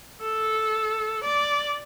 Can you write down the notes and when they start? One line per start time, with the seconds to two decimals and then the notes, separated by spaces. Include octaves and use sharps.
0.22 A4
1.24 D5